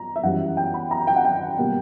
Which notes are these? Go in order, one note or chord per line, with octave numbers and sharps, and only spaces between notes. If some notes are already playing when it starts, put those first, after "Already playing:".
Already playing: A#5
E5
F#2 E3 G3 F#5
G5
B5
A#5
G5
F#5
G5
B2 G3 A#3